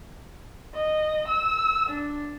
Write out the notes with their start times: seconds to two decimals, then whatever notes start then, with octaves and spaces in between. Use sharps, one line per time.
0.74 D#5
1.28 E6
1.89 D4